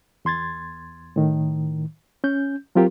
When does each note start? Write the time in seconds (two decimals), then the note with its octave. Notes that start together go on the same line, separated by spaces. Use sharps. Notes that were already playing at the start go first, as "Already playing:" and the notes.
0.25 E2 C6 G#6 A6
1.16 A2 D#3
2.24 C#4 G6
2.75 F#3 C4 F4 G4 A#4